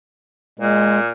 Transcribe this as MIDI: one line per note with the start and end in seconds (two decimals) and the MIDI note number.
0.59 1.12 46
0.59 0.99 56